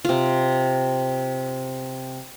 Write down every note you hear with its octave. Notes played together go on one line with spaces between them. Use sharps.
C3 F4